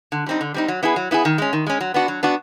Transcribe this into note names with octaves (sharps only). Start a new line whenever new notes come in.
D3
G3 C4 D#4
D3
G3 C4 D#4
F#3
B3 E4 G#4
F#3
B3 E4 G#4
D#3
G#3 C#4
D#3
G#3 C#4
F#3
B3 D4 F#4
F#3
B3 D4 F#4